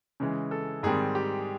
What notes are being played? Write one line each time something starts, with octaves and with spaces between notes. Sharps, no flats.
C#3 E3 G#3
A4
G#2 D#3 G3 C4 G#4
G4